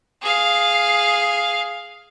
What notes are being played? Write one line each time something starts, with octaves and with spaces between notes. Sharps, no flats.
G#4 F5